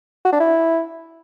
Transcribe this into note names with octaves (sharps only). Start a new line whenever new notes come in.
F#4
D4
E4